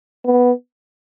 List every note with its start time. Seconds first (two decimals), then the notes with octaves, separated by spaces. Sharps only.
0.25 B3